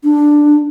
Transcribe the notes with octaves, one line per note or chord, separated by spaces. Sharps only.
D4